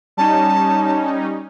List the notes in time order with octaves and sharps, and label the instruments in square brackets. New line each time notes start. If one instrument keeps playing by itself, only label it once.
[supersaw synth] G3 C#4 D#4 [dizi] A5